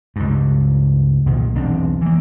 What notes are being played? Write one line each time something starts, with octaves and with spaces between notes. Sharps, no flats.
C#2 G2
C2 A#2 D#3
B1 E2 C4 D4
E3 A#3